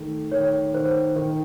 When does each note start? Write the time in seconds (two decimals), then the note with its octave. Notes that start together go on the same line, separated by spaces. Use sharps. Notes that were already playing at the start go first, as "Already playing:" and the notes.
Already playing: D#3 A3
0.31 D#3 C#5
0.74 D#3 C5
1.16 D#3